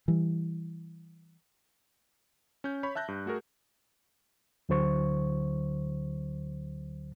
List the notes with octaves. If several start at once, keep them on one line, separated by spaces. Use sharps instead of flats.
E3 G3
C#4 G6
C#5 B5 C#6
E5 A5 F#6 G6 A#6
G2
A3 F#4 G#4 A#4
D2 D3 F#3 C5 C#6